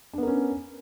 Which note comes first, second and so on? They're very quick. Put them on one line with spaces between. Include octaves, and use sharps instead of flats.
D4 B3 A#4 C#4